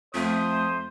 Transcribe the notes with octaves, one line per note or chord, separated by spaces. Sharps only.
F2 A3 C5 D#6